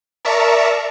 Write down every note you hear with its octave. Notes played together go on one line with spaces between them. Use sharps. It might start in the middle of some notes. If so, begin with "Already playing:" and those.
A#4 D5 E5 A5 A#5 C#6